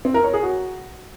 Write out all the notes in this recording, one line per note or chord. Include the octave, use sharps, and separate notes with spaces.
C4
A#4
C#5
G#4
F#4